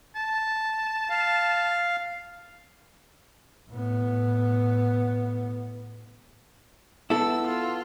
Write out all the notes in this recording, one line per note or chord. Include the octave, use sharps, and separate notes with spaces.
A5
F5
A2 B3
B3 E4 A4 E6
F4